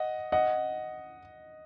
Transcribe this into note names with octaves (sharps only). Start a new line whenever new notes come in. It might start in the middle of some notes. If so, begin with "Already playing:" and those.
Already playing: D#5 F#5
D#5 F#5